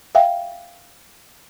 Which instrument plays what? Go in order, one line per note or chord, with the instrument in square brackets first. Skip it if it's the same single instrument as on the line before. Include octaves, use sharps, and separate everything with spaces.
[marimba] E5 F5 G5